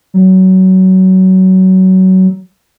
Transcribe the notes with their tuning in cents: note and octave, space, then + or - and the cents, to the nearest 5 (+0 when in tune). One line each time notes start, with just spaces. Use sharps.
F#3 +20